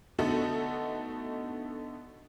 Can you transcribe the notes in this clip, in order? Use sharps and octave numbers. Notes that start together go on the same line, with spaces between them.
D3 A3 B3 D#4 F#4 A4